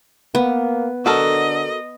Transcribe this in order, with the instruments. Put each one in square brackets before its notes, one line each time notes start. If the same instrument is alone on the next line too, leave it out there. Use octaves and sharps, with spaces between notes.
[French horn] A#3 [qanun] B3
[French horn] D3 [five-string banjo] F#4 A4 A#4 [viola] D#5